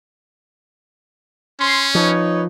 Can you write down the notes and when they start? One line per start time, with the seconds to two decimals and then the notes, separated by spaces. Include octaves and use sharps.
1.60 C#4 C6
1.95 F3 D#4 B4 C#5